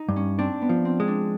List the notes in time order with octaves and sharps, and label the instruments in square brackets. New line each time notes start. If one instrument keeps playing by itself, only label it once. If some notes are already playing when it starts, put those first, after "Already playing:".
Already playing: [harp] D#4
[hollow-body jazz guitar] G2
[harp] C#4
[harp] C4 [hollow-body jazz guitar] D4
[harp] B3
[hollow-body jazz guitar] F3
[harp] C4
[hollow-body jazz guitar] G#3
[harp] D4